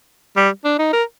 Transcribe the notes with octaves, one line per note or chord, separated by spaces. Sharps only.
G3
D4
D#4
A#4